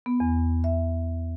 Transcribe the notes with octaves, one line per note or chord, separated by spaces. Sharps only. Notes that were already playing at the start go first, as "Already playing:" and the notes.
B3
E2
E5